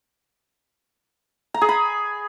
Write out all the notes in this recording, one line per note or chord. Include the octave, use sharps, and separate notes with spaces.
A#5
G#4
B5